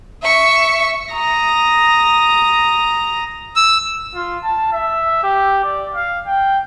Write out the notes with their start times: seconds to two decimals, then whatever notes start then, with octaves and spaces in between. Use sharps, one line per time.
0.23 E5 C#6
1.12 A#5 D#6
3.56 E6
4.15 F4
4.44 A5
4.73 E5
5.23 G4
5.65 D5
5.94 F5
6.27 G5